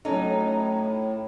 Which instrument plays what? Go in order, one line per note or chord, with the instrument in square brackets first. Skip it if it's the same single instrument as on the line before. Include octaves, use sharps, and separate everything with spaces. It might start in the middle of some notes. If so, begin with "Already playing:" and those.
[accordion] A2 [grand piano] F#3 C#4 A4 [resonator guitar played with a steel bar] D#4